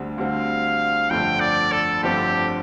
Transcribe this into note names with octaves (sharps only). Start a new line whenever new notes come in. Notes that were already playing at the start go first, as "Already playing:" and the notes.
Already playing: D2 D3 G3 C4
D2 D3 G3 C4 F5
G1 F2 D3 A3 C4 G5
D5
A4
G1 F2 D3 A3 C4 G4